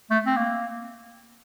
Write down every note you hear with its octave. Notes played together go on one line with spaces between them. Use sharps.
A3
C4
A#3